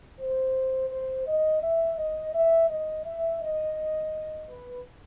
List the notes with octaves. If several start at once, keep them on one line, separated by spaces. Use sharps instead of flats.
C5
C5
D#5
E5
D#5
E5
D#5
E5
D#5
B4